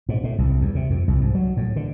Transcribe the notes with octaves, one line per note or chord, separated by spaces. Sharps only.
G#2
A2
C2
E2
C3
F2
C2
G#2
F#3
A2
D3